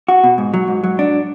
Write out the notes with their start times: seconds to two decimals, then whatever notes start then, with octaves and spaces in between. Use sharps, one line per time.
0.08 F#4
0.24 B2
0.38 G#2
0.54 F#3
0.68 G#2
0.84 F#3
0.99 D4